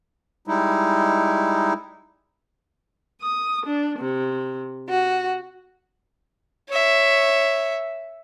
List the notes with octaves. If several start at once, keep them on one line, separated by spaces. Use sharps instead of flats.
G3 G#3 D#4 E4
D#6
D4
C3
F#4
C#5 E5